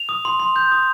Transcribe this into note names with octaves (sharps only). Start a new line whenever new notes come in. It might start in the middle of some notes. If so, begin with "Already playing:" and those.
Already playing: F7
D#6
C6
C6
G6
D#6